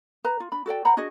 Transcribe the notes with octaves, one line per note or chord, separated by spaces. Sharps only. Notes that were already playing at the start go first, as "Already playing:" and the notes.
B4 A#5
F4
D4 B5
F#4 A4 D5 G5
C5 F#5 A#5 B5
D4 F#4 G#4 D#5